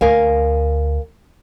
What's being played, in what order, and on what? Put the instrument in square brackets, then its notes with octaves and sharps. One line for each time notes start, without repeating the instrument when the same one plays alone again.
[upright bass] D2 [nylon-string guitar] A#4 F5 G#5